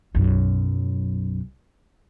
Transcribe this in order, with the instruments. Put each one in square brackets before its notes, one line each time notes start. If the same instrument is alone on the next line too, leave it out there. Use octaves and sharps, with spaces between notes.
[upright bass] B1 F#2